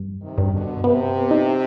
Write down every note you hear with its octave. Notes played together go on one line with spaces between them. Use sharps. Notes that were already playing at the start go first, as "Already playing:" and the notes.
Already playing: G2
C3 D#3
G2
B2 D3
C3 B3
D#4